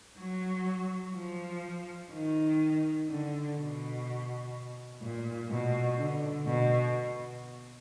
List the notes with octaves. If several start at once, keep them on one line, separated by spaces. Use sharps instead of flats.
F#3
F3
D#3
D3
B2
A#2
B2
D3
B2